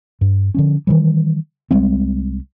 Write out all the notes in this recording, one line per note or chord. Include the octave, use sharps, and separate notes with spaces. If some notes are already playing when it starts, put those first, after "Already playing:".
G2
D3 F3 C#4
D#3 E3 G3
C2 G3 G#3 C4